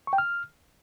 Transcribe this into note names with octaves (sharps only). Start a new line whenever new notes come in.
C#6
G5
F6